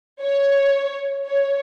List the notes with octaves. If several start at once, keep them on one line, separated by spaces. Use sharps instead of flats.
C#5
C#5